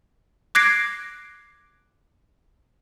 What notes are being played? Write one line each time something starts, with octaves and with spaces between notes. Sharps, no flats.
D6 F#6 G#6 A#6 C7 D7